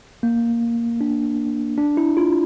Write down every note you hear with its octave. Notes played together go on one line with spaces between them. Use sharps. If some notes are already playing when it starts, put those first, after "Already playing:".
A#3
D4
D4
E4
F4